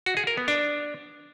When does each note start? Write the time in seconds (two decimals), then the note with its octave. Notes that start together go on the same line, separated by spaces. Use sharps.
0.06 F#4
0.17 G#4
0.27 A#4
0.37 B3
0.48 D4